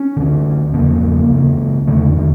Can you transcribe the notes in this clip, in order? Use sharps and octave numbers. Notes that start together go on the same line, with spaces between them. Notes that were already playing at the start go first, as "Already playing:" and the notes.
Already playing: C#4
D2 D3
E2 C#3 A#3
C#2 C#3
E2 D3 A3
D3